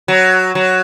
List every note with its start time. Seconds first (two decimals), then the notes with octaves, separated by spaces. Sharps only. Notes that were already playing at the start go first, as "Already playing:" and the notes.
0.08 F#3
0.55 F#3